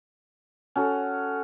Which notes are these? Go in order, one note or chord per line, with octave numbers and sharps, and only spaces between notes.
C#4 F#4 A4